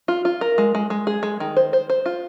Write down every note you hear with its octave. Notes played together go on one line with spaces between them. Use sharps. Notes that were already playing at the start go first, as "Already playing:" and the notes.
F4
F4
A#4
G#3
G#3
G#3
G#4
G#3
D#3
C5
C5
C5
F4